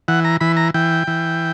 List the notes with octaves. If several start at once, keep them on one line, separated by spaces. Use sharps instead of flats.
E3 F#5
A#5
E3 B5
A#5
E3 G5
E3